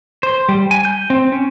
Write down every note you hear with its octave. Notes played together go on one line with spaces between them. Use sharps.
C5
G3
G#5
G6
C4
C#4